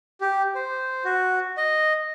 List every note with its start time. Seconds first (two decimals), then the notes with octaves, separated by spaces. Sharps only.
0.21 G4
0.55 C5
1.05 F#4
1.57 D#5